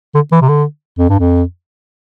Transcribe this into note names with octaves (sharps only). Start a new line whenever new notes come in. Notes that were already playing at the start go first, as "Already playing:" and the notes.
D3
E3
C3
D3
F2
G2
F2